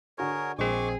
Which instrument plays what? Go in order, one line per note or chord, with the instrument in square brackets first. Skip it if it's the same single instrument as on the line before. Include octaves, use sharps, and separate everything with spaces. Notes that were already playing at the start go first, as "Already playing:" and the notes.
[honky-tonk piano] D3 F#4 C#6 [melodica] G#4 A#4 C#5
[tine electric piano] A#1 C4 [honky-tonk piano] G#3 [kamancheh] G#4 [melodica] C#6 D6